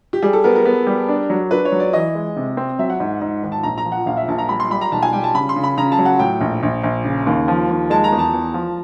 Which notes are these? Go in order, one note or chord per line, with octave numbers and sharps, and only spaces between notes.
G4
G3 G#4
A4
B3 A#4
A#4
B3
G3
D4
F#3
D4 B4
C#5
F#3
D5
E3 D#5
G#3
C3
C4
F#3 E5
F#5
G#2
G#2
G#1
A5
A#1 A#5
A#5
F3
F#5
A#1 F5
E5
A#1 A5
A#5
G3 B5
C6
G3 B5
A#5
B1 A5
G#5
G3 G5
A5
C#3 B5
C6
C#3
B5
C#3 A#5
A5
F#3
F#5
A2 G5
A#1
A#1
A#1
C#3
D#2
F3
D#2
G#3 A5
A#5
E2
A5
E2
F3